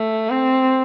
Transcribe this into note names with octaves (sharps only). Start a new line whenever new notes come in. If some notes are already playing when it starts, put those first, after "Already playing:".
Already playing: A3
C4